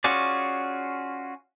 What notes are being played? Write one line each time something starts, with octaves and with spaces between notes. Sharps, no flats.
C#4 F4 F#4 G#4 D5